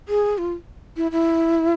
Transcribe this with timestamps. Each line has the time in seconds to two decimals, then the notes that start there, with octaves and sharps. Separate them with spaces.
0.09 G#4
0.38 F4
0.97 E4
1.12 E4